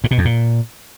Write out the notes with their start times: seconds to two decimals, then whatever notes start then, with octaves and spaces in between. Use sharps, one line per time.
0.04 G#2
0.11 B2
0.18 F2
0.25 A#2